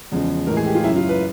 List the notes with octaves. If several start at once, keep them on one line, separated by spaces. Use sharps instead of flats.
E2 C#3 F3 G#3
A2 E3 G#3 A#4
G#4
G4
F4
F#2 C#3 F#3 E4
F4
B4